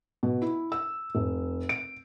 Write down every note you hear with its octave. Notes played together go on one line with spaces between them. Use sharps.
B2
E4
E6
F1
D7